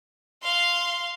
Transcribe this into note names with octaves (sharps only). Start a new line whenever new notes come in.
F5 C6